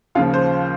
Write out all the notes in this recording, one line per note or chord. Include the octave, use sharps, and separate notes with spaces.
D#2 C#3 F3 F4
C5